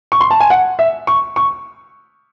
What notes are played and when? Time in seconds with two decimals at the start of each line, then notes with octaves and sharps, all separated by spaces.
0.12 C#6
0.21 C6
0.31 A5
0.41 G#5
0.50 F#5
0.79 E5
1.07 C#6
1.36 C#6